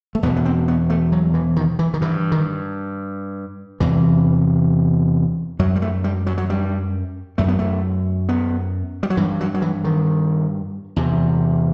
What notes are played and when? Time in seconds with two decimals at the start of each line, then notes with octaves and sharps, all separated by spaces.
0.15 A3
0.23 E2 B2 B3
0.36 B3
0.45 C4
0.68 B3
0.90 A3
1.12 F#3
1.34 E3
1.56 D#3
1.79 E3
1.94 D#3
2.01 G2 E3
2.32 D#3
3.80 E2 C3 E3
5.59 F#2 F#3
5.76 G3
5.82 A3
6.04 G3
6.27 F#3
6.38 F#3
6.50 G3
7.38 F#2 A3
7.48 B3
7.59 A3
8.29 B3
9.03 G3
9.10 F#3
9.17 G2 E3
9.41 F#3
9.54 F#3
9.62 E3
9.84 D#3
10.96 E2 C3